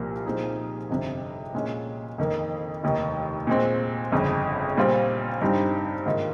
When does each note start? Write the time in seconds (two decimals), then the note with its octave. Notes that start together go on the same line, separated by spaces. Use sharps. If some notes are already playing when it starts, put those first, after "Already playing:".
Already playing: C2 A#2 F3 A#3
0.26 A#2 F3 C4 D#4 G#4
0.90 G1 F2 C3
1.54 A#2 G#3 C#4
2.18 F2 D#3 A#3
2.83 F1 D#2 D#3
3.47 A#2 G#3 C4
4.12 G1 F2 C#3
4.77 A#2 G3 C4 F4
5.41 G2 G3 C4 D#4
6.06 G#2 D#3 A#3 F4